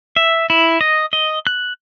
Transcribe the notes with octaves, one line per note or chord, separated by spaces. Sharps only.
E5
E4
D#5
D#5
F#6